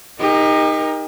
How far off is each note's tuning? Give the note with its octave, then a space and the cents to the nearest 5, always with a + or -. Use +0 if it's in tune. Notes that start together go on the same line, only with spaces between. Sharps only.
D#4 +5 G4 +40 A#4 +5